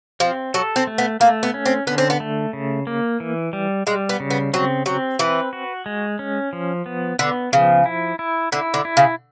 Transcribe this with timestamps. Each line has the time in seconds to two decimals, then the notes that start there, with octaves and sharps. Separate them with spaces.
0.20 F3 C4
0.54 F#3 A4
0.76 C4
0.87 A3
0.98 B3
1.20 A3 A#3
1.43 B3
1.54 C#4
1.66 C4
1.87 D3 B3
1.98 C4
2.10 B3
2.20 A3
2.53 C#3
2.87 A#3
3.20 E3
3.53 G3
3.87 G3 G#3
4.09 B3
4.20 C#3
4.30 B3
4.53 F#3 C4
4.86 F#3 C4
5.19 E3 B4
5.53 F#4
5.86 G#3
6.19 C#4
6.53 F3
6.86 B3
7.19 D3 B3
7.52 C#3 F3
7.86 E4
8.19 E4
8.52 D3 E4
8.74 D3
8.85 E4
8.97 C#3